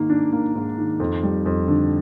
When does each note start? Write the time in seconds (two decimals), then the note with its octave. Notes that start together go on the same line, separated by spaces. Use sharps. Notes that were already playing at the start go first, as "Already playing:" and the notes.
Already playing: G#2 D#3 A#3
0.10 D4
0.32 A#3
0.55 G#2
0.78 D#3
1.00 F2
1.23 G3
1.46 F2
1.68 D3